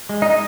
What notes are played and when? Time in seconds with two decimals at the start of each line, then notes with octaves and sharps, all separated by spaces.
0.09 G#3
0.22 D#4 D#5